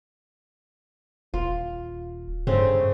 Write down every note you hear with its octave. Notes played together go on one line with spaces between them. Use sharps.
D#1 F4
G2 C#3 A3 C4